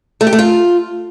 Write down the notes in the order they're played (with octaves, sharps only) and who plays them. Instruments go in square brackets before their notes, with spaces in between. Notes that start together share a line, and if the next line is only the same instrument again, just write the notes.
[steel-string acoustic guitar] A3
G4
A3
F4